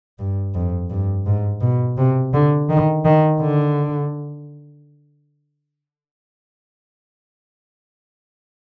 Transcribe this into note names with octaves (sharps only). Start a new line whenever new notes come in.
G2
F2
G2
G#2
B2
C3
D3
D#3
D#3
D3